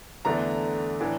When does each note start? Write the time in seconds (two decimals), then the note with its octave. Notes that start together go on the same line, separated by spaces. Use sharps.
0.25 E2 D3 A3 D4 A#5
1.00 A2 E3 A3 D4